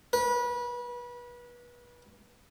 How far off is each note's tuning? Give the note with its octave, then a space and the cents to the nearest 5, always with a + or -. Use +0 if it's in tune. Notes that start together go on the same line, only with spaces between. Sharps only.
B4 -30